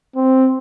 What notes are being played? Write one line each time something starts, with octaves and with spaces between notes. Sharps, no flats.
C4